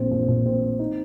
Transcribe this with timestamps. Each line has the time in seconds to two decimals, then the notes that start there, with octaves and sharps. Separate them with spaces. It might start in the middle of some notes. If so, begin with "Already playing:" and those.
Already playing: A#1 C4
0.11 A#2
0.28 A#2
0.46 C4
0.63 C4
0.79 D#4